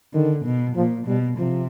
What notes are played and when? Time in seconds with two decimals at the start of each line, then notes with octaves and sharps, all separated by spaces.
0.14 D3 D#3
0.45 B2
0.76 A#2 F3
1.07 B2 G3
1.38 C3 F3